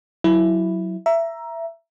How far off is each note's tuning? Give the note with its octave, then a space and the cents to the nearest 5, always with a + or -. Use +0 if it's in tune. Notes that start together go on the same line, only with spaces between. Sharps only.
F#3 +0 E4 +0
E5 +15 A#5 +10